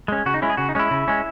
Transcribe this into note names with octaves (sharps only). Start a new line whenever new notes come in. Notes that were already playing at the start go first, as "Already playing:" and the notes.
G#3 C#4
C#3 F#4
D#4
G#3 C#4 E4
G#4
C#3 F#4
D#4
G#3 C#4 E4
C#3
G#3 C#4